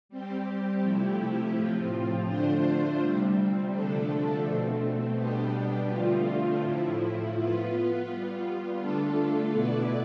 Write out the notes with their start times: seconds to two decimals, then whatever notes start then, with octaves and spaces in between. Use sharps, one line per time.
0.09 G3 C4 G4
0.82 C3 F3 A3 E4 G4
1.54 A2 F3 C4 F4
2.26 D3 A3 D4 F4 C5
2.99 C3 G3 C4
3.72 D3 F3 A3 D4 A4
4.44 B2 A3 C4
5.16 B2 G3 B3 D4 G4
5.90 D3 F3 A3 C4 F4
6.62 A2 F3 A3 E4
7.34 B3 F4 B4
8.07 G3 B3 F4
8.79 D3 A3 D4 F4 A4
9.52 B2 B3 E4 B4 D5